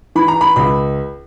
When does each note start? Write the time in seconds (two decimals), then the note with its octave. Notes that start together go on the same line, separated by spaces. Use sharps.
0.15 E3 B5
0.28 A#5
0.41 B5
0.56 C#2 B5